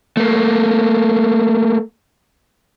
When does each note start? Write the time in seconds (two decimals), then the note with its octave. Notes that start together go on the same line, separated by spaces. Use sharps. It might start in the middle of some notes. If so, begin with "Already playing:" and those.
0.17 A3 A#3